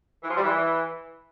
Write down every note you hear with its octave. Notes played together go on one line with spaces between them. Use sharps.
E3
F3
G3
E3